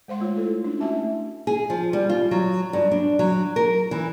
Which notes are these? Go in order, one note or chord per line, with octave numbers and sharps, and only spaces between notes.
G#3 C5 F5 C6
A3 F4 C#5
E4 A4
C#4 D4
A3 E4 F#4 E5 A5
G#4
F3
G3
F4
F#3
G2
D4
F#3
A#4
E3